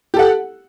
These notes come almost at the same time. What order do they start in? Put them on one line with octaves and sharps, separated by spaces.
G4 A4 F#5